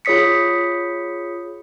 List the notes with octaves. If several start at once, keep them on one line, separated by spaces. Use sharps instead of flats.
F4 G#4 C#5 D#6 B6 C#7